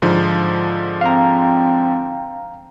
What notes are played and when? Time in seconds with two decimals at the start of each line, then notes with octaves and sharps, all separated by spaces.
0.02 G#2 D3 F3
1.01 C4 F5 A#5